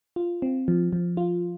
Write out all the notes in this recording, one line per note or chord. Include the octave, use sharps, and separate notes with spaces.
F4
C4
F3
F3
F4